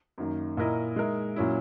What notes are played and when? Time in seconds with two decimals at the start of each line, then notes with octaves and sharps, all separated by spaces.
0.18 F#2 D#3 A#3
0.57 A#2 A#3 E4 A#4 D#5
0.96 G#3 D#4 A#4 E5
1.36 A#2 F#3 C#4 E4